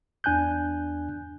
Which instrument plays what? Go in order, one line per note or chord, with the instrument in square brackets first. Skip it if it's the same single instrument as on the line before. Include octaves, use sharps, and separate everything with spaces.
[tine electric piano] E2 D4 G#5 F#6 G6